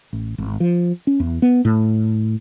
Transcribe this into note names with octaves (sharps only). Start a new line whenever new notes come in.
A1
G#1
F3
C#4
E2
B3
A2